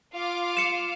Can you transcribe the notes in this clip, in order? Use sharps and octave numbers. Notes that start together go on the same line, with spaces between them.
F4 F5 D6
C#7 E7